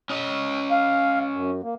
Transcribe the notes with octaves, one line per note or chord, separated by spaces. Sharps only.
C#4 D#5
F5
F#2
A#3